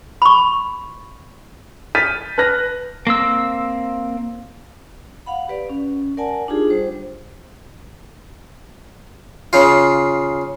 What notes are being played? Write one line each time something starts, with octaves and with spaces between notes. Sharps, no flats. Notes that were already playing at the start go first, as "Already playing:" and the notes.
B5 C#6
F6 G6 A6 B6 D#7
B4 A5 F6 F#6 A#6
A#3 C4 E6
F5 F#5 B5
G4 B4 D5
C#4
A#4 D5 F#5 G#5 A5
D4 D#4 F4 G4 G#4
G3 C5
C#3 F4